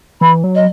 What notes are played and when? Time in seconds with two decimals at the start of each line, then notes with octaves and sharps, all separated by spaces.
0.21 E3 B5
0.44 F#3
0.55 D#5